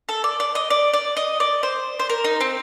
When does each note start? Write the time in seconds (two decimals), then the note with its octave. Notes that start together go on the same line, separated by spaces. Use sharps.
0.09 A4
0.24 D5
0.40 D5
0.55 D#5
0.70 D5
0.94 D5
1.17 D#5
1.40 D5
1.63 C5
2.00 C5
2.10 A#4
2.24 D#4
2.41 C4